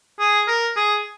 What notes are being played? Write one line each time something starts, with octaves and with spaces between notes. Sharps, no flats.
G#4
A#4
G#4